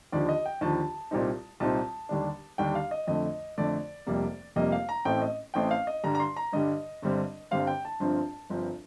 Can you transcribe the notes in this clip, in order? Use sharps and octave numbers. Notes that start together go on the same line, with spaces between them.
D#2 D3 F3 D5
D#5
G5
D#2 D3 F3 A5
C2 A#2 G3 C4 D#4
C2 A#2 G3 C4 D#4 A5
D#2 D3 G3 D4
D#2 D3 G3 D4 G5
F5
D#5
F2 D3 A3 D#5
F2 D3 A3 D5
F1 F2 C3 G3 A#3
F1 F2 C3 G3 A#3 D#5
F5
A#5
A1 A2 A3 C4 G5
D#5
A1 A2 A3 C4 G5
F5
D#5
G2 D3 G3 A#5
A#5
C6
A#5
G2 D3 G3 D#5
G1 G2 D3 G3 C4
G1 G2 D3 G3 C4 F5
G5
A5
G1 G2 F3 C4
G1 G2 F3 C4